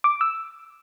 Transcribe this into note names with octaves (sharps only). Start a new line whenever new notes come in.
D6
E6